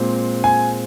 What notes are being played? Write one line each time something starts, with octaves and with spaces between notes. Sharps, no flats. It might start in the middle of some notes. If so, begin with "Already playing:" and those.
Already playing: A#2 G#3 C4
G#5